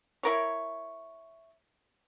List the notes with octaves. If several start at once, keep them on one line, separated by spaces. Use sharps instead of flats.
E4 A#4 C#5